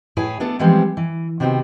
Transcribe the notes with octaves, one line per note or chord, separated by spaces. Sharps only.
A2 E4 G#4 B4 C#5 G#5
A3 B3 D4 A4
E3 F3 G3 G#3 B3 C4
E3
C3 D#3 B3 C4 F#4